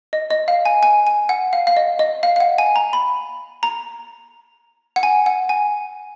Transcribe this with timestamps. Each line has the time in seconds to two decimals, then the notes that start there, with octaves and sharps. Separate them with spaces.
0.13 D#5
0.30 D#5
0.48 F5
0.65 G#5
0.83 G#5
1.07 G#5
1.29 F#5
1.53 F5
1.67 F5
1.77 D#5
1.99 D#5
2.23 F5
2.36 F5
2.40 F#5
2.58 G#5
2.76 A#5
2.93 B5
3.63 A#5
4.96 F#5
5.03 G#5
5.26 F#5
5.49 G#5